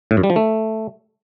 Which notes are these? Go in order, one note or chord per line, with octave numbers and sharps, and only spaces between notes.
A2
F#2
G3
F3
A3